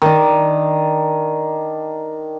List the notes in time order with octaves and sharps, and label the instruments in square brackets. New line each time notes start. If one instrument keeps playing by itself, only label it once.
[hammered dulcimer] D#3 D4